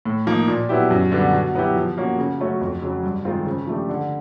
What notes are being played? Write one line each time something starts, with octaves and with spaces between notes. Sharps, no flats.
A2
F3 A#3 D#4
A#2
F#3 B3 E4 G4
F#2
D3 G3 B3 D4
B2
F#3 B3 E4 G4
F3
A#3 C#4 F#4
C#3
F#3 A3 C#4 F#4
F2
C#3 F#3
G2
D#3 G#3 C4 F4
C#3
F3 A3 D4 G4
D3